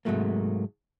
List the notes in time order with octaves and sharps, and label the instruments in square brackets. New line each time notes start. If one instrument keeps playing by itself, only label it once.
[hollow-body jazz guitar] G#2 C3 F#3 A3 A#3